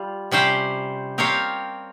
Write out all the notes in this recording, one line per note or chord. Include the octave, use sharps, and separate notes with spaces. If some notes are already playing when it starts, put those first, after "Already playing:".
Already playing: G3 F4
C3 G3 C#4 G4 C5
C4 G4 A#4 C#5 F5